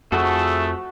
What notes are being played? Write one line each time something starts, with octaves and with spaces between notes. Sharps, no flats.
F2 A3 E4 F#4 G#4 A4